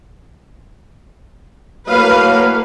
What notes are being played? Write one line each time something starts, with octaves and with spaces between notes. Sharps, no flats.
A2 F#3 A#3 B4 F5